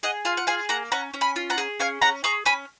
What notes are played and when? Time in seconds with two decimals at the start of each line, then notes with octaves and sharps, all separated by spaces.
0.03 G#4 D#5 F#5
0.25 F4 F5 G#5
0.37 F#5
0.47 G#4 F5 G#5
0.69 A#3 F#5 A#5
0.92 C#4 F#5 A#5
1.14 C#4
1.21 G#5 B5
1.36 F4
1.50 F#5 A#5
1.58 G#4
1.80 C#4 F5 G#5
2.02 C#4 F#5 A#5
2.24 G#4 A#5 C#6
2.46 C#4 G#5 B5